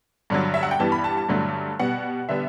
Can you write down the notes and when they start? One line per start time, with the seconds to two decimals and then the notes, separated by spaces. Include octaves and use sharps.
0.30 G2 D3 F#3
0.54 E5
0.63 F#5
0.71 G5
0.79 G2 E3 G3 B3 A5
0.92 B5
1.04 A5
1.17 A5
1.28 G2 D3 F#3 A3
1.79 B2 G3 B3 F#5
2.29 D3 G3 B3 E5